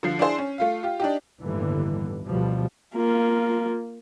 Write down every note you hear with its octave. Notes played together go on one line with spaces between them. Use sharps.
D3 F3 C7
D4 E4 G#4 C5
C#4
A3 F4 F5
F4 G4
D4 D#4 G4
G1 D#2 A2 D3 E3 G3
D2 B2 F3 G3
A#3 F4